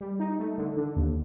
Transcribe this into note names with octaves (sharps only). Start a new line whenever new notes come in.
G3
D#4
A3
D3
D3
D#2